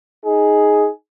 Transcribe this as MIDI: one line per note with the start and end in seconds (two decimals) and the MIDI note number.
0.25 0.88 63
0.25 0.88 68